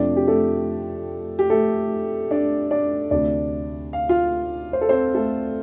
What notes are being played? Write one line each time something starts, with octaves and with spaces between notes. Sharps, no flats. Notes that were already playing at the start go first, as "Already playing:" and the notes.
Already playing: F2 C3 F3 A3 D4 D5
G4
A3 A4
G4
A3 A4
D4 D5
D4 D5
D2 C3 A3 D4 D5
F5
F4 F5
C5
A4
C4 C5
A3 A4